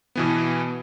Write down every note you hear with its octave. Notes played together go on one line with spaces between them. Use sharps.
B2 E3 B3